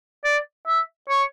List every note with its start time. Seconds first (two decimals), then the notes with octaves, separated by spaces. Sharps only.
0.24 D5
0.67 E5
1.09 C#5